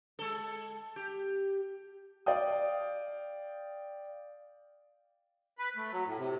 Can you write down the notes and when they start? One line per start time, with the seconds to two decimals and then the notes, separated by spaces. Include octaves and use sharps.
0.19 G#3 A4
0.96 G4
2.26 D5 F5 G5 D#6
5.58 B4
5.76 A3
5.92 F#3
6.06 A2
6.18 C3